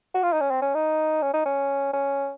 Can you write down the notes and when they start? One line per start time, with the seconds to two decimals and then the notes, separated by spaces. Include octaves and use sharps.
0.14 F#4
0.23 F4
0.33 D#4
0.40 C#4
0.51 C4
0.61 C#4
0.74 D#4
1.22 C#4
1.33 D#4
1.45 C#4
1.93 C#4